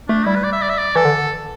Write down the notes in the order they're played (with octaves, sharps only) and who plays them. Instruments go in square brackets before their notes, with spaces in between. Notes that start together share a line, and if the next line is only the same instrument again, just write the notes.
[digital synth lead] A3 [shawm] D4
[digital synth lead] G3 [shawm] E4
[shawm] B4
D5
E5
D5
E5
D5
[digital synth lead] E3 [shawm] A4
[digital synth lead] D3